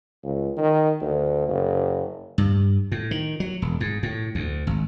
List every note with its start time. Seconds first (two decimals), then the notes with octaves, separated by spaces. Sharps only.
0.23 C#2
0.57 D#3
1.01 D2
1.49 F#1
2.38 G2
2.92 A2
3.11 D#3
3.40 F#3
3.62 E1
3.80 G#2
4.03 A2
4.35 D2
4.67 G#1